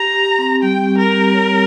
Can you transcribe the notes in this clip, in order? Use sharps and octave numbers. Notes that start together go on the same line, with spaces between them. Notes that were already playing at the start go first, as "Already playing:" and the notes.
Already playing: G4 A#5
G4
C4
G3 G5
G3
A#4
G4
C#5